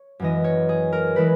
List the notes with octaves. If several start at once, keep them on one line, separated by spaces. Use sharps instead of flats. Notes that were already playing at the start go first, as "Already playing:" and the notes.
Already playing: C#5
F#2 E3 G#3 D#5
C#5
G#4
A#4
E3 G#3 B4